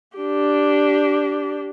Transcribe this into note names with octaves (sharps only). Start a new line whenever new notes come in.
D4 G4